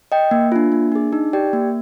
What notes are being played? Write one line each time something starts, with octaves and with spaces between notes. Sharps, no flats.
D#5 G5
A#3
D4 F4
A#3
D4 G#4
D#4
G4 D5 G5
A#3